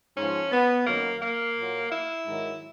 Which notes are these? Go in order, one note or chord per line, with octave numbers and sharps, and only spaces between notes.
G#2 F3 C#4
B3
F#2 D#3 F#3 A#3
A#3
A#2 F#3
E4
G#2 D#3 F#3